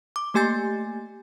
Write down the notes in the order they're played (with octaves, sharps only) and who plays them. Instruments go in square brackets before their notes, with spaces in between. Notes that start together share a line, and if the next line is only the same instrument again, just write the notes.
[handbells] D6
A3 A#3 G4 G#5 G6 A6